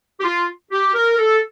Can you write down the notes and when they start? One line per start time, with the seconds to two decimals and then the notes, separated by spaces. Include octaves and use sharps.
0.19 G4
0.23 F4
0.71 G4
0.94 A#4
1.18 A4